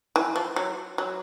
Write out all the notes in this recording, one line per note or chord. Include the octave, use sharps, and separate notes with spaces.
E3
F3
F#3
F#3